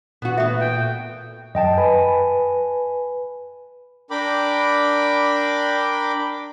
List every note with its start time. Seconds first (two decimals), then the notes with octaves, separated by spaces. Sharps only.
0.22 A#2 B3 F#4
0.37 A3 B3 E5
0.61 G5
1.55 F#2 D#5 G5 A5
1.78 B4 G#5 B5
4.10 D4 A#4 G5 B5 D6